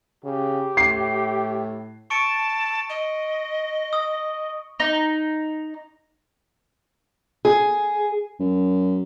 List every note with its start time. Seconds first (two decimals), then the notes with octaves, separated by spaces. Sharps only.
0.24 C#3 G4
0.77 A2 C7
2.10 A5 C#6 C#7 D7
2.90 D#5
3.93 D#6
4.80 D#4
7.45 G#4
8.39 F#2